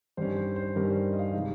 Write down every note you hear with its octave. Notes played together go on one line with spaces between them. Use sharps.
G2 D#3 G3 C#4 C5
C5
C5
G2 D#3 G3 C#4 A#4
C5
D#5
F5
C3 F3 G#3 D#4